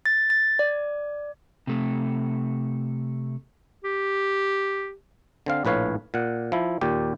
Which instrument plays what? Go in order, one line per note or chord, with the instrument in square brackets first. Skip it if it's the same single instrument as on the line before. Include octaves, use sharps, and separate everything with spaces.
[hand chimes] A6
A6
D5
[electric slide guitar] C3 A3
[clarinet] G4
[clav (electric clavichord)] D3 C4 F5
A#1 A2 B4 C#5 F5
A#2 F#5
F3 E4
D#2 A#2 G4